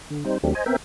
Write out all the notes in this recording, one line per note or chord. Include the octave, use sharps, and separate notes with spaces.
D3
G3 C4 D#4 C5
D#2 F#3 A3 C4 D4 G4
C5 D#5 G#5
B3 C4 A#4 E5 G5